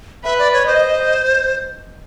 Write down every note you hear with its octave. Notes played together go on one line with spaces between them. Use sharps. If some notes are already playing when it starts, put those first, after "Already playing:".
B4 E5
D5
C#5
C5 D#5